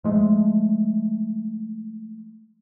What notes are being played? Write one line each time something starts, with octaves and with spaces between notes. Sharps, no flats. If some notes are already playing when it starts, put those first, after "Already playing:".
F3 G#3 A3